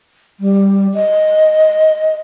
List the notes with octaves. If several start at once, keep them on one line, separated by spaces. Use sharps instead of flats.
G3
D#5